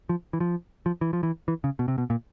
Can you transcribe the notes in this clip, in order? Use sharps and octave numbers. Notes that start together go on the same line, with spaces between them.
F3
E3
F3
F3
E3
F3
E3
E3
C#3
B2
C3
B2
A#2